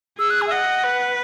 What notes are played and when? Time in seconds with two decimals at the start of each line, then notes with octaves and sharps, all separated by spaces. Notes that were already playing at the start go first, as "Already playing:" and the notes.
0.19 G#4 E6
0.30 F#6
0.41 G#5
0.47 E5
0.52 D#5 F#5
0.84 B4